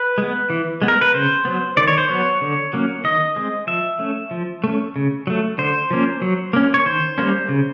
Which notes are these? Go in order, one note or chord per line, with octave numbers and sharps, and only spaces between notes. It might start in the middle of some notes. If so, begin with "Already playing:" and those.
Already playing: B4
G#3 B3
E3
G#3 B3
A#4
B4
C#3 C5
F#3 B3
D#3 D5
C#5
C5
F#3 B3 C#5
D3
F#3 A#3 C#4
D#3 D#5
G#3 C4
F3 E5
A3 C#4
F3
A3 C#4
C#3
F#3 A3
D3 C5
F3 A#3 C#4
F#3
A#3 C#4
C#5
D#3 C5
G3 A#3 C#4
C#3